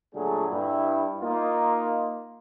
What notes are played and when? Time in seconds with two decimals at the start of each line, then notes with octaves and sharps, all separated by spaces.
0.14 A#2 D3 F#3 G3 A3 G#4
0.49 G2 E4
1.22 A#3 D#4 F4